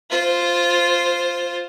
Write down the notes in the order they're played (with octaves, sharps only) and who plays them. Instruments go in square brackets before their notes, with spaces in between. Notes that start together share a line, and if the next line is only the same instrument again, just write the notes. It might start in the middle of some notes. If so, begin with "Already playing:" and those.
[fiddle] F4 C5